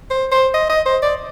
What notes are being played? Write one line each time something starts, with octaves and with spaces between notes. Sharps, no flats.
C5
C5
D#5
D#5
C5
D5